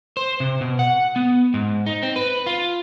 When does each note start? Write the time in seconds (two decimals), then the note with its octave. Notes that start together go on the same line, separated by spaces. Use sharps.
0.17 C5
0.40 C3
0.61 B2
0.79 F#5
1.16 B3
1.54 G#2
1.86 D#4
2.03 C4
2.16 B4
2.46 F4